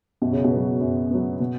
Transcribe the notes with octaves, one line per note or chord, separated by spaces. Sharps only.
F#2 B2
C#3
B2
F#3 B3
F#2
F#3 B3
B2